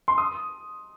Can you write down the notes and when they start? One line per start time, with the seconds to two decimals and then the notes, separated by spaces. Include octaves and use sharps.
0.08 C6
0.18 D#6